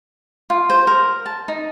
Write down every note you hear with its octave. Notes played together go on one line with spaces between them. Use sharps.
F4
C5
A#4
A5
D#4